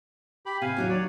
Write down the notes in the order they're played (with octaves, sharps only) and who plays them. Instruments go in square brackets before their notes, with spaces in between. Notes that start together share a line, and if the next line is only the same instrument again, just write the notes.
[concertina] G4 B5
[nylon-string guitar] C3 [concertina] F5 G#5
[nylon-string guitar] D#2 F#3 D#4
[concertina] C#5 D5